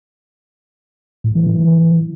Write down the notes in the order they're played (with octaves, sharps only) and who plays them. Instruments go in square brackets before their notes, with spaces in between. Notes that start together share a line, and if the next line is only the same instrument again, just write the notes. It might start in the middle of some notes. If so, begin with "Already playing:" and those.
[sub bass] A2
E3
E3